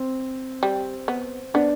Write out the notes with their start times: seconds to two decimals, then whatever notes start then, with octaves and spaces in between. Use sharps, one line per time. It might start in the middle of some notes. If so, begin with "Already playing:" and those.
Already playing: C4
0.63 G3
1.08 B3
1.54 B3 D4